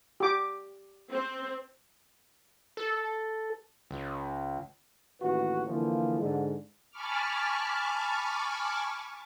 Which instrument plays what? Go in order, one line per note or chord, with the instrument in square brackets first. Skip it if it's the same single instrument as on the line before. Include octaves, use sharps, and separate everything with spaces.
[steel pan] G4 D6
[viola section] C4
[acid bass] A4
C#2
[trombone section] A1 D#2 F#4 B4
D3 E3 F3 A#3
G#2 D3 G#3
[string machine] G#5 A5 B5 C#6 D6 F6